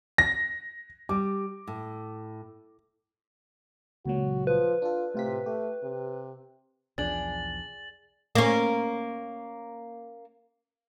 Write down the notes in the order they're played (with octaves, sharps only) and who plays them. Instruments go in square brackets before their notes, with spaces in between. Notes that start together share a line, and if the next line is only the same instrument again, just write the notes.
[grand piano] A#6
[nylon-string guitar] G3 [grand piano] D6
[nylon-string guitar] A2
[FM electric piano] C#2 A#2 F#3 [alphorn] F#4
[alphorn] F3 [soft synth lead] B4
[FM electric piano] D4 A4 [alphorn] F4
[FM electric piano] A2 F4 B6 [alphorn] C3
[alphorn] A3 [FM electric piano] G4
[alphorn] C3
[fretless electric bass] B1 E2 F3 [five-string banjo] D4 [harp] G#4 D5 [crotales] A6 F#7
[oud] A#3 C#4